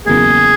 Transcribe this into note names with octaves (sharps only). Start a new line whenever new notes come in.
E2 C#3 F#3 A#3 G#4